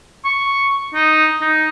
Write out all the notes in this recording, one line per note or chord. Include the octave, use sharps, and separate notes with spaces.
C#6
D#4
D#4